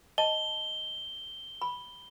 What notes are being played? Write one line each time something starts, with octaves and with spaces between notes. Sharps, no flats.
D#5 A5 G7
B5